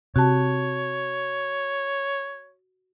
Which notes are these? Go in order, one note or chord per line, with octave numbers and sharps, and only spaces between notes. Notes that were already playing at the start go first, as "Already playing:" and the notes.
C3 F#4 C#5 A5